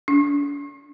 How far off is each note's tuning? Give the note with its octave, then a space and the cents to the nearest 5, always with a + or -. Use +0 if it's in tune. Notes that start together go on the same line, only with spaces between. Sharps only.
D4 -35